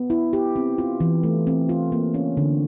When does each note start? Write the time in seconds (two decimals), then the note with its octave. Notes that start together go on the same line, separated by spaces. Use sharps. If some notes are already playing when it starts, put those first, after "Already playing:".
Already playing: B3
0.10 E4
0.33 G4
0.56 C4
0.78 F4
1.00 E3
1.23 A3
1.47 C4
1.69 F4
1.92 A#3
2.14 C#4
2.37 D3